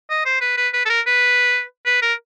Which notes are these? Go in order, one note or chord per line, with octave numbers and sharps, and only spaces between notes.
D#5
C5
B4
B4
B4
A4
A#4
B4
B4
A#4